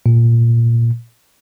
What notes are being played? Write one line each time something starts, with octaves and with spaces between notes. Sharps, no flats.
A#2